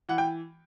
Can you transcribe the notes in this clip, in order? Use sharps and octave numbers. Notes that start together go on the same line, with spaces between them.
E3 F#5
G5